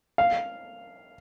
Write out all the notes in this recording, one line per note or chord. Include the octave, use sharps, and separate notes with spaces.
F5